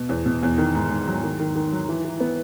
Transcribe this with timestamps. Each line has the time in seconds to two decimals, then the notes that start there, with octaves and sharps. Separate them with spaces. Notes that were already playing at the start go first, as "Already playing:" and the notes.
Already playing: B2
0.09 E2
0.26 B2
0.43 E2
0.58 D#3
0.75 G#2
0.90 G#2
1.07 F#3
1.23 D#3
1.39 D#3
1.55 D#3
1.72 F#3
1.88 E3
2.04 E3
2.20 B3